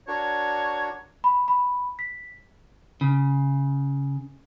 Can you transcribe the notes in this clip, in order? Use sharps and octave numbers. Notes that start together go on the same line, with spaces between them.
D4 F#4 A#4 C#5
B5
B5
B6
C#3